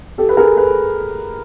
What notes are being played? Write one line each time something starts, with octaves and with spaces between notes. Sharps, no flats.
G4 A4
B4
G#4 A#4
A4 B4